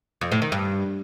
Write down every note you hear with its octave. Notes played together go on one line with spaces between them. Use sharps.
F2
A2
D#3
G2